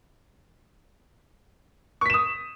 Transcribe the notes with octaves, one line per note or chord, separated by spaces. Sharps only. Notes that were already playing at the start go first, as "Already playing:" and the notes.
C#6 D#6 B6 E7